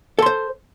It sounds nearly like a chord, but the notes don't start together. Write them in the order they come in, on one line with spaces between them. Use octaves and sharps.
A4 C6 C5